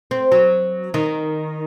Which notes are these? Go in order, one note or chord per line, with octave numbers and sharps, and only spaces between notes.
C4
F#3
D#3